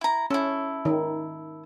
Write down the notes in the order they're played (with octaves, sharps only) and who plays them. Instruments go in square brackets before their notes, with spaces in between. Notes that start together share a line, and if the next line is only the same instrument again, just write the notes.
[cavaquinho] E4 A#5
[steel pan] C#4 [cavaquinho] E4 A4
[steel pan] D#3